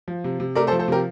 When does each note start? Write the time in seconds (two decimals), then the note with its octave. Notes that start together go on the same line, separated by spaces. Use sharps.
0.08 F3
0.24 C3
0.40 C3
0.55 A3 A#4 D5
0.67 A4 C5
0.72 F3
0.79 A4 C5
0.88 C3 G4 A#4